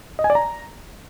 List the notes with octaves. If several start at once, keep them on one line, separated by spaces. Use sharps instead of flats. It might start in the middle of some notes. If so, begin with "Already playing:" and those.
D#5
G#5
D5
A#5